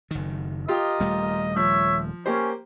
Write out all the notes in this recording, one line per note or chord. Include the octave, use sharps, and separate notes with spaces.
F#1 D#3
F4 G4 A#4 D#5
D#1 G3 A3
F3 C#5 E5
A#3 C#4 G4 C5